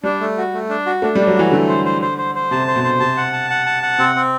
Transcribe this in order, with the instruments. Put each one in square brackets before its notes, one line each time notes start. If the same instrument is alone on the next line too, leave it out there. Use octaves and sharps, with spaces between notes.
[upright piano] G3 [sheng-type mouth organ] D4
[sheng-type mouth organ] A3
F#4
A3
D4
F#4
[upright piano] A3 [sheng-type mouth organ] D4
[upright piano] G3 [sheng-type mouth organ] D4
[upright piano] F#3
[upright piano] E3 [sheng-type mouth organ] F#4
[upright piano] D3 [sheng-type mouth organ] A3
[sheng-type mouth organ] C5
C5
C5
C5
C5
[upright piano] C3 [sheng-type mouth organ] A5
[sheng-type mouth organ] C5
[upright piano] B2
[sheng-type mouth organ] C5
[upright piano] C3 [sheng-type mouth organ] A5
[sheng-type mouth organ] F#5
A5
F#5
A5
F#5
[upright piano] C3 [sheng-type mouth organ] C4
[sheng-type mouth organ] C4